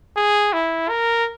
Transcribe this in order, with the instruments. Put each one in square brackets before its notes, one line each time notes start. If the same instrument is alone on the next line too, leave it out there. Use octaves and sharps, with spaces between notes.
[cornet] G#4
E4
A#4